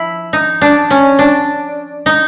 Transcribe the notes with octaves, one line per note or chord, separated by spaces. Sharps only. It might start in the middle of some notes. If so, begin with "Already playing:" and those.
Already playing: F3 E4
D#4
D4
C#4
D4
D#4